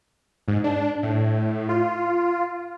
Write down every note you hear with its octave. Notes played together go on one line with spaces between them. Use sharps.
G#2
D4
A2
F4